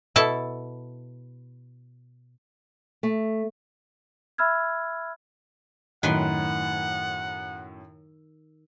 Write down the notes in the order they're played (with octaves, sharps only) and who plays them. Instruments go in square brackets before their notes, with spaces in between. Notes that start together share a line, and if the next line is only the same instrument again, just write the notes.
[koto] B2 E4 A4 A5
[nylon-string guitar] A3
[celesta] E5 B5 E6 F6 G#6
[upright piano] F#2 A2 [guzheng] D#3 B4 C6 [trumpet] F#5